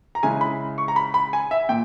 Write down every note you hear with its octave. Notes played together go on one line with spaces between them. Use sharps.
A#5
C#3 G#3 C#4 E4 G#5
B5
C#6
A#5
B5
B5
G#5
E5
A#2 G5